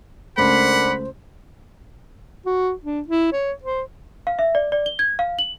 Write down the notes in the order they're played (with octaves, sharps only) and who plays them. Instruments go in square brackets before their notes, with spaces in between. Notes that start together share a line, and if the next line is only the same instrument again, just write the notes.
[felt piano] C#2 A3 [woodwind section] D4 A#4 B5 [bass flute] C5 [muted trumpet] F#5
[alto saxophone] F#4
D4
E4
C#5
C5
[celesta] F5
E5
D5
D5
G7
G#6
F5
F#7